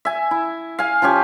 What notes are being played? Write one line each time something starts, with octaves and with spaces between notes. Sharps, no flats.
E5 G#5
E4
F5 G#5
F3 C#4 G4 G#5